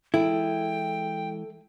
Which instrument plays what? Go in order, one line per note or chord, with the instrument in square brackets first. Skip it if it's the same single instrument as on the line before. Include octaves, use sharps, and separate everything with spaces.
[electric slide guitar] E3 G#3 [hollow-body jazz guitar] E4 [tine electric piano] A4 [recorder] G5